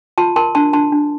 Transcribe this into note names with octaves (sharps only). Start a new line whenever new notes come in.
F4 A5 C6
A#4 A5 C6
D4 A5 C6
D4 A5 C6
D4